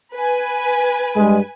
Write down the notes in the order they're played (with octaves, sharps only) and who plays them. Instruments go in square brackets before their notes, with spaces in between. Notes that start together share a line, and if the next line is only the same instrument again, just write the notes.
[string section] B4 G#5
[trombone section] G2 G#3